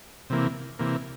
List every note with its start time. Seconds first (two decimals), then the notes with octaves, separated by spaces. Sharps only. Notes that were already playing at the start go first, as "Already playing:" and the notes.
0.30 C3 E3 A#3
0.79 C3 E3 A#3